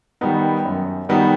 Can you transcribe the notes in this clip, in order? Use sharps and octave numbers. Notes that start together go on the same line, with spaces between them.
D#3 G3 B3 D#4
F#2
D#3 G3 B3 D#4